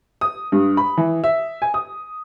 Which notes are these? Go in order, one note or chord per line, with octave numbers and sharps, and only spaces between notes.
D#6
G2
B5
E3
E5
G#5
D#6